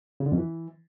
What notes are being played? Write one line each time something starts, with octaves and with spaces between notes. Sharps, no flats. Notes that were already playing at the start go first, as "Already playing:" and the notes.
C#3
D3
F2
E3